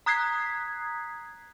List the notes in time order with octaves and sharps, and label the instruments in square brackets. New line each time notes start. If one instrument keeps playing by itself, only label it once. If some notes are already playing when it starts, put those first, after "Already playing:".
[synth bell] A#5 D#6 F#6 G#6 B6 C7